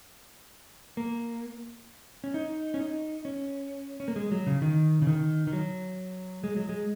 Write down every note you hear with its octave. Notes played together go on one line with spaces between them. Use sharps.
A#3
C#4
D#4
C#4
D#4
C#4
C#4
A#3
G#3
F#3
C#3
D#3
C#3
D#3
D#3
F#3
G#3
F#3
G#3